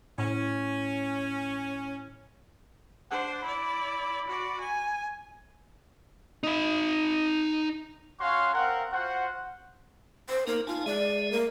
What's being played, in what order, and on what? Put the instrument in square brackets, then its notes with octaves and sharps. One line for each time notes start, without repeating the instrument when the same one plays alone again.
[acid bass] A2 [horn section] C#4
[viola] D4 C5 [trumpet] F#5
[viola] E4 D5 [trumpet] B5
[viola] F#4 D5
G#5
[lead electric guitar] D#4 B5
[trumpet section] C#4 F#4 C#5 F5 C6 C#6
C4 A#4 F5 F#5
F4 F#4 C5 F#5
[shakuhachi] C5
[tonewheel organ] A#3 B3 D#4 [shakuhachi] A#4
[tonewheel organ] D#4 G#5 A5 [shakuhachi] F4
[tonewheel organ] G#3 G#4 E5 [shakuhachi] D5
[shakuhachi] A#3